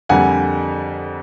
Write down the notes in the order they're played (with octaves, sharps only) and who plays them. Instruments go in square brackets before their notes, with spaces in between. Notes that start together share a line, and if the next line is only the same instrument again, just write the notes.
[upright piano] F2 D3 G3 A#3 F#5 G#5